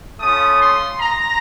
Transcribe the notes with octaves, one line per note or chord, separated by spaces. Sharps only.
A3 C#4 F4 D#6
C6
A#5